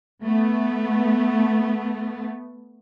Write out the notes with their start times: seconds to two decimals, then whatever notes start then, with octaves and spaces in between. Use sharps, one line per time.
0.24 A3 B3